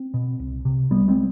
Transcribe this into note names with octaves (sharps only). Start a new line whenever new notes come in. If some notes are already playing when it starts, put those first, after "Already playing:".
Already playing: C4
B2
C2
C3
C2 G3 B3
G#3 C4